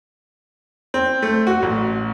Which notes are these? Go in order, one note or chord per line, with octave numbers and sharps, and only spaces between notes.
C4
A3
F#4
A1